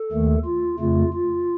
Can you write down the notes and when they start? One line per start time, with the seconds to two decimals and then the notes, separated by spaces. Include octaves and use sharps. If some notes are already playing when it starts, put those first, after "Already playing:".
Already playing: A4
0.12 D#2 D#3 A3
0.45 F4
0.79 F2 C#3 A3 F4
1.13 F4